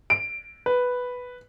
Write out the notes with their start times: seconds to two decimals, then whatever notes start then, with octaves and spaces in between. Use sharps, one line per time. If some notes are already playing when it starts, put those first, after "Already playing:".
0.10 D7
0.66 B4